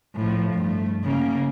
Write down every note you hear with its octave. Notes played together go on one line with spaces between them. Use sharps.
A2 F3
G2 A3
C#3 A#3